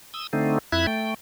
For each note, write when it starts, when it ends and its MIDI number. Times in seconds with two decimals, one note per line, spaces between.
0.14 0.27 87
0.14 0.27 88
0.33 0.58 50
0.33 0.58 57
0.33 0.58 60
0.33 0.58 63
0.72 0.86 41
0.72 0.86 64
0.72 0.86 76
0.72 0.86 90
0.72 0.86 92
0.87 1.14 57
0.87 1.14 79